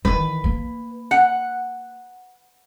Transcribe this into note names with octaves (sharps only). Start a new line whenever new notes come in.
D#3 E3 B4
A#3
F#5